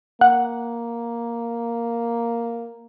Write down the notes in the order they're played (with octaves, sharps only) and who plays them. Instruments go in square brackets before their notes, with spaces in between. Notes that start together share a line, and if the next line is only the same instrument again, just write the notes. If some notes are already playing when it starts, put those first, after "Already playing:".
[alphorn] A#3 [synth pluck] F#5